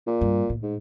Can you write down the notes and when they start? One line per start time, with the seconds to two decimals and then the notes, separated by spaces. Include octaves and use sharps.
0.07 A#2
0.21 G2
0.50 A2
0.63 G#2